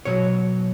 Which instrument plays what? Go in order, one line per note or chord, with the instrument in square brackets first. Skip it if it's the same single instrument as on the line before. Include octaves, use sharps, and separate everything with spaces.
[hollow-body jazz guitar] B2 F#3 C#5